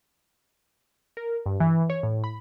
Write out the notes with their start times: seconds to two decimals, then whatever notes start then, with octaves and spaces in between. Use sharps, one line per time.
1.17 A#4
1.46 G2
1.60 E3
1.90 C#5
2.03 A2
2.24 B5